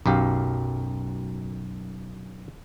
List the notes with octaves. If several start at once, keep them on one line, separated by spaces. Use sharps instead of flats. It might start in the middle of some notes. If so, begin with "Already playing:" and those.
B1 F#2 G4 F5